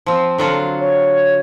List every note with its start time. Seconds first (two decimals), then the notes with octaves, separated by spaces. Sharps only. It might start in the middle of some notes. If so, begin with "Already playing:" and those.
0.06 F3 C4
0.38 D3 F#3 F4
0.80 C#5